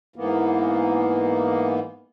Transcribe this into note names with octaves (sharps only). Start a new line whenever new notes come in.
G#2 E3 A#3 B3